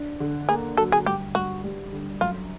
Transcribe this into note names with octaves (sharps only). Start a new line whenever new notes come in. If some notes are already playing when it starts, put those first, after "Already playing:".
Already playing: D4
D3
A#3 G#4
F#3 A4
G#4
G2 G4
G2 F#4
G3
D3
F#2 F4